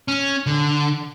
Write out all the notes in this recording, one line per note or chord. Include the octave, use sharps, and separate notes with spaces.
C#4
D3